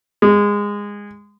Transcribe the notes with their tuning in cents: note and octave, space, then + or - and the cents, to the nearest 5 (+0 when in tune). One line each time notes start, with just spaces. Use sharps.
G#3 -20